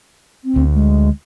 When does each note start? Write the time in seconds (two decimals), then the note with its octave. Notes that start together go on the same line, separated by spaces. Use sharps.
0.45 C4
0.56 D2
0.74 G#3